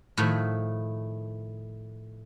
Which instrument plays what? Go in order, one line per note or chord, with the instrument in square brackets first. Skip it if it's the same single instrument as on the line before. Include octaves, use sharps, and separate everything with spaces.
[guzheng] A2 D#3 F3 A3